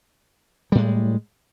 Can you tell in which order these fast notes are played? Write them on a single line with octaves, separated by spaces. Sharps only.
G3 A2 G#3